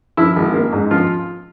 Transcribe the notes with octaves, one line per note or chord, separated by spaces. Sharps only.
F3 E4
G#1
A#3
G#2
F3 F4